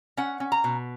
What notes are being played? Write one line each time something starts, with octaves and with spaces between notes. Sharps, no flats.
C#4 F#5
C#4
A#5
B2